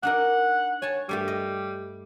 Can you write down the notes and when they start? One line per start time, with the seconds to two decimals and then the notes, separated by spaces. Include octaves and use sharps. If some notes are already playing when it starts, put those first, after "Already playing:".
0.03 D4 D#4 A#4 F#5
0.82 C#5 G#5 A5
1.09 G2 G3 A3 G4
1.28 D#5